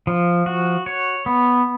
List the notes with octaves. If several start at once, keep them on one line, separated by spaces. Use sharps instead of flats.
F3
F#4
C#5
B3